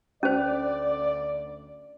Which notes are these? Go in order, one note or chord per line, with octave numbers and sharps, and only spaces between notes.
D2 C#4 C5 D5